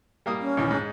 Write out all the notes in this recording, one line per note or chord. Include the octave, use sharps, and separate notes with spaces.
G3 A#3 D#6
C#4
A#1 D#2 E3
G#2 G#3